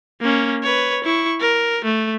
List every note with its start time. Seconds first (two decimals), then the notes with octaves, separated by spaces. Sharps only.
0.21 A#3 C#4
0.63 B4 C#5
1.04 E4 C#6
1.41 A#4
1.85 A3